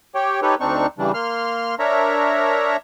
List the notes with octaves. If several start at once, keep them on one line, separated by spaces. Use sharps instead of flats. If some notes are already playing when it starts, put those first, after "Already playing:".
G4 C#5 G5
D#4 G4 A4 B4 C#5
D2 C4 D4 D#4 C#6
G2 C#3 E3 G3 D4
A#3 C6 F6
D4 A#4 C#5 E5 A#5